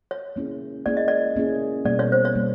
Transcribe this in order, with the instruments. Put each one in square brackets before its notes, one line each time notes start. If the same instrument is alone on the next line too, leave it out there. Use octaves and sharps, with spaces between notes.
[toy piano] C#5
[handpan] A#3 C#4 E4 G#4
[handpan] A#3 C#4 E4 G#4 [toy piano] D5
[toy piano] D#5
D5
[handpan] A#3 C#4 E4 G#4
[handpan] B2 G3 A#3 [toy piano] D5
[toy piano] C#5
C5
C#5
[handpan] B2 G3 A#3